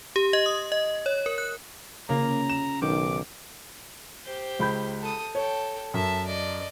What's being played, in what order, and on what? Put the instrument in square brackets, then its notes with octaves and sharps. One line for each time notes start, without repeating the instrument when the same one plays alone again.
[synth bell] G4
D#5
D#6
D#5
C#5
A#4
F#6
[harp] C#3 F4 [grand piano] A#3 [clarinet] A#5
[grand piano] E7
[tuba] B1 [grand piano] D#3 [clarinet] D6
[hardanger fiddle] G4 C5
[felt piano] C#2 B5 G6
[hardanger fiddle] A4 D#6
[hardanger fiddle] A4 G5 [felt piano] C#5
[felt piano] F#2 [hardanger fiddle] E5 A5
[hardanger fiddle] D5 D#5